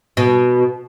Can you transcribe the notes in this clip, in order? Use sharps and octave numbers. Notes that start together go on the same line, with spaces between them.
B2